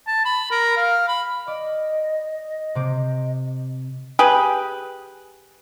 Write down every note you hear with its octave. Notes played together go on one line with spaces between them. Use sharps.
A5
B5
A#4
F5
B5
D5 D#5
C3 C4 D6
G4 G#4 B4